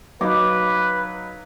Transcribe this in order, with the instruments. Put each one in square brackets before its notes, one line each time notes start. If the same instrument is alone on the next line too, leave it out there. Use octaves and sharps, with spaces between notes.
[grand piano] F#3 D#4 [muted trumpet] B4 [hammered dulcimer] F5 D6